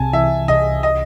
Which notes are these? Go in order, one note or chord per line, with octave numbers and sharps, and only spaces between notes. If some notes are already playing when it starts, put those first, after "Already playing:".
Already playing: C2 C3 G#5 A5
E3 E5
C2 D#5
D#5